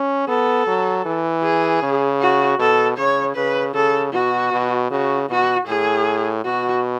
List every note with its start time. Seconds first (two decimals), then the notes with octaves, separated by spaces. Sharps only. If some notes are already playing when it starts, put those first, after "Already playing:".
Already playing: C#4
0.28 B3 A4
0.67 F#3
1.05 E3
1.43 G#4
1.83 C#3
2.21 F#4
2.59 B2 A4
2.98 C#3 C#5
3.36 C#3 B4
3.75 C#3 A4
4.13 B2 F#4
4.52 B2
4.91 C#3 F#4
5.30 B2 F#4
5.67 A2 G#4
6.45 B2 F#4